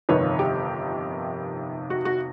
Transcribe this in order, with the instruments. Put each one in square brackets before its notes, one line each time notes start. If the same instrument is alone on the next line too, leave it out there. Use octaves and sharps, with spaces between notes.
[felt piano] G1 F2 C3 D#3 B4 C#5
G4
F#4
F#4